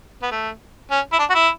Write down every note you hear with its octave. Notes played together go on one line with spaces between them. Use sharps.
B3
A3
C#4
E4
D4
F#4
E4